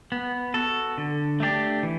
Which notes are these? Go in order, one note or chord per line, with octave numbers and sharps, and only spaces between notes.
B3
F#4 A4
D3
A3 D4 G4 D5
E3